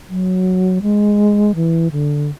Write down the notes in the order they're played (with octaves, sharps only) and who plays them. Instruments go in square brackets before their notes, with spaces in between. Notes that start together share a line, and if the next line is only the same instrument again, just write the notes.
[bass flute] F#3
G#3
E3
D3